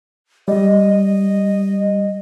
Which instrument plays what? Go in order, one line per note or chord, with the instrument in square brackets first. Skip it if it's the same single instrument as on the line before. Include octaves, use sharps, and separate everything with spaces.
[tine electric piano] G3 [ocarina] D#5